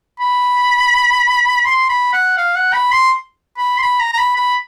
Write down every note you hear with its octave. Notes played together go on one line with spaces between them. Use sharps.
B5
C6
B5
F#5
F5
F#5
B5
C6
B5
C6
B5
A#5
A#5
B5
B5